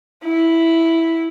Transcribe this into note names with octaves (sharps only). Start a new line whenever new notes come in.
E4